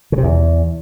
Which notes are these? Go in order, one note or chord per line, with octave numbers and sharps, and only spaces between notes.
C#3
C3
E2